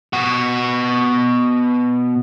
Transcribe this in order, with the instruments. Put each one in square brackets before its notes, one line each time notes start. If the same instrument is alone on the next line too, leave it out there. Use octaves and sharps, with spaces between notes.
[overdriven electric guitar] B2 F#4